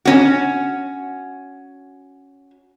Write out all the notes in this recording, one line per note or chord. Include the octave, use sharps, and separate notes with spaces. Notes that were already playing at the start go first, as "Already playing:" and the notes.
C#4 F#4